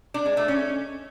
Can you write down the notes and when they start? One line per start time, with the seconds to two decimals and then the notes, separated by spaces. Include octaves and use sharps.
0.14 D4
0.26 G#3
0.37 A3
0.48 C#4